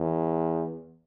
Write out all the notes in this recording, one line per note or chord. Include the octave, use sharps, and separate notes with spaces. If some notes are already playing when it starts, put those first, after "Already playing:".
Already playing: E2